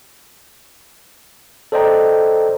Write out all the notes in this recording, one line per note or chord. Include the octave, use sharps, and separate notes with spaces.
A4 C5 D5 D#5 G5 A#5